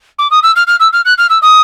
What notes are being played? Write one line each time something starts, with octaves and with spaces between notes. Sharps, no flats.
D6
D#6
E6
F6
F6
E6
F6
F#6
F6
E6
D#6